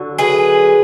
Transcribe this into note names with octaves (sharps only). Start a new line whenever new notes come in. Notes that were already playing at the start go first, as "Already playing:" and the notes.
Already playing: D3 F#3
G#4 B4